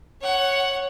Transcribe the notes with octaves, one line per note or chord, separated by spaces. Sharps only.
C#5 F#5